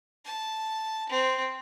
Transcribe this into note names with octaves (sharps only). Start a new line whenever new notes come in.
A5
C4